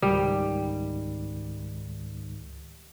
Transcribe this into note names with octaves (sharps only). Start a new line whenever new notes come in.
C#2 G#2 D#3 G3